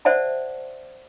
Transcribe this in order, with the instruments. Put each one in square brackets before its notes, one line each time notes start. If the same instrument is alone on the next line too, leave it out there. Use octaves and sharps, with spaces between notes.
[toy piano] C5 D5 E5 F#5 A5